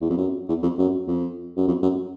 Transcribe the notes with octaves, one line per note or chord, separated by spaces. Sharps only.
E2
F2
F#2
E2
F2
F#2
F2
F#2
F2
F#2